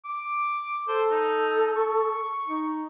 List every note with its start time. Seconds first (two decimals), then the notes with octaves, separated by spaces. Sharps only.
0.05 D6
0.89 A4 C5
1.11 D#4
1.77 C#6
2.47 D#4